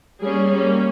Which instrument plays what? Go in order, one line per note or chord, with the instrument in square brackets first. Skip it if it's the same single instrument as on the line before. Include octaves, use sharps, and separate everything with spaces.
[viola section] G3 A#3 C#4 G#4
G3 A#3 C#4